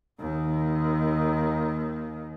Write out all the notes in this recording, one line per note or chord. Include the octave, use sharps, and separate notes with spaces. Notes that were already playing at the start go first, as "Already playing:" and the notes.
D#2 D#3